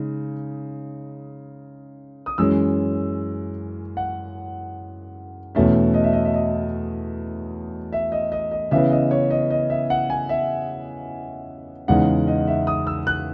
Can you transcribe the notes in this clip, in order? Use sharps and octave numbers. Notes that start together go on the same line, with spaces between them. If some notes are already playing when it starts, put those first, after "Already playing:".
Already playing: C#3 G#3 D#4
D#6
F#2 E3 G#3 C#4 E6
F#5
E2 B2 A3 C#4 E5
D#5
E5
D#5
E5
D#5
E5
D#5
D#5
D#5
C#3 E3 B3 E5
D#5
C#5
D#5
D#5
E5
F#5
G#5
E5
E2 C#3 G#3 D#4 F#5
D#5
E5
D#6
E6
F#6